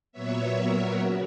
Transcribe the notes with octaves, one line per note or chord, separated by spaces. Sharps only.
A#2 F#3 B3 C#5 E5
A#4 C#5
C#3 F#4